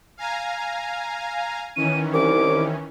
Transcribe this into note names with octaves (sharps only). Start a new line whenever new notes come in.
F5 G#5 A#5
D#3 E3 C#4 D#7
C2 D6